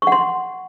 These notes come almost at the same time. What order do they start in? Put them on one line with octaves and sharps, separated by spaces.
C#6 F#5 C6